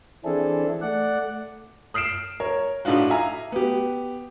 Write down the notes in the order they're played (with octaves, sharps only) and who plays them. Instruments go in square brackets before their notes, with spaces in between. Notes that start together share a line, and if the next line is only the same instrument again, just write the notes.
[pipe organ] E3 C4 D4 E4 G#4 A4
A3 D5 F#5
[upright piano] D#6 F6 C7 D7 E7
A#4 C#5
A2 D4 D#4 F4 F#4
E5 F5 G#5 A#5
B3 G4